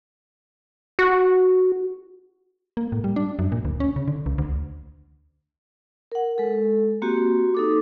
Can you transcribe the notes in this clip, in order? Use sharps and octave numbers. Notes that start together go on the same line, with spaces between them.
F#4
A#3
A2
G3
D4
F#2
A#2
D2
C#4
C#3
D3
C#2
D2
A#4 F#5
G#3 A4
A#3 C4 F#4 G4
D#4 A4 D6